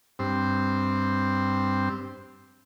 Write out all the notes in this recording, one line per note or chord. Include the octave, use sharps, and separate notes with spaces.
G2 C4